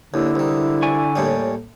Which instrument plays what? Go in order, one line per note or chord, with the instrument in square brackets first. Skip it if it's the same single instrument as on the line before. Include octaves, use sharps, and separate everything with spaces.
[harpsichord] D#2 [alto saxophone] D3 [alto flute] E4
[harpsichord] C2 D#3
[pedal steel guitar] D5 G#5 C#6
[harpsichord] D#2 A2 G3